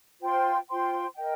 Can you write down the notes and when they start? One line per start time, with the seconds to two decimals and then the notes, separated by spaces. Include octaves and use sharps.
0.20 F4 C5 G5 C6
0.68 F4 C5 G5 C6
1.16 A#4 D#5 G5